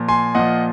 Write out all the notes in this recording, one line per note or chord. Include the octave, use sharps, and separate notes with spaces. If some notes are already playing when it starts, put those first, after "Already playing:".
Already playing: A#2 F3
G#5 C6
A#2 F3 D#5 F#5